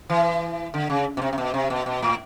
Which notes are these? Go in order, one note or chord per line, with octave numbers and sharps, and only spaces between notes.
E3
D3
C#3
B2
C3
C3
B2
C3
B2
B2
A2